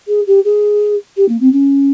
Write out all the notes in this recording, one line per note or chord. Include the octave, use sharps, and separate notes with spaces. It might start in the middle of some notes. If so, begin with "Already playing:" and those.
G#4
G4
G#4
G4
A#3
C4
C#4